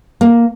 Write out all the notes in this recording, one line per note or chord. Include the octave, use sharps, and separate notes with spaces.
A#3